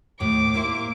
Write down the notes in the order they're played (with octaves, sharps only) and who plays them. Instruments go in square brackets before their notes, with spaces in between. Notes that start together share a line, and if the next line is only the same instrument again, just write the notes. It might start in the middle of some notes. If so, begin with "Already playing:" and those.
[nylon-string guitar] D#2 A2 [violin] D6
[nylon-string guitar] A#3 E4 C5